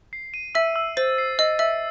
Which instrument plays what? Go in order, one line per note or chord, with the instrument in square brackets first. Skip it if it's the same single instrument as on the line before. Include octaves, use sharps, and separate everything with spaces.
[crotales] C7
D#7
[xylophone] E5 [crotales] E6
[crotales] E6
[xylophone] C5 [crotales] A6
[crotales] C7
[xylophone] D#5 [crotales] E6
[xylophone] E5 [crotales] E6